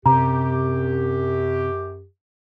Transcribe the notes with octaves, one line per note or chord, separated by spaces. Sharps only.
F#2 C3 G4 A#5